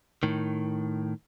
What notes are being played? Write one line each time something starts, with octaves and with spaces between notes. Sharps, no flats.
A2 D#3